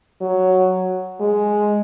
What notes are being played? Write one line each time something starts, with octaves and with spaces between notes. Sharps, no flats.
F#3
G#3